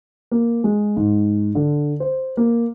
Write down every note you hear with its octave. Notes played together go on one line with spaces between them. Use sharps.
A#3
G#3
G#2
D3
C5
A#3